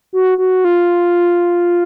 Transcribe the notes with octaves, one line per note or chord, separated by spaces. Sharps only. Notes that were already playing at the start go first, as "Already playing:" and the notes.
F#4
F#4
F4